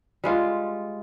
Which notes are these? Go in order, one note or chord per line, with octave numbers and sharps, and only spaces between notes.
G3 G#3 F4